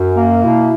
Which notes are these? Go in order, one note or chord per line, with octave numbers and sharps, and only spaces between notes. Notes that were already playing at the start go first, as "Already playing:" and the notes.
Already playing: F#2 F#4
A#3
B2 E4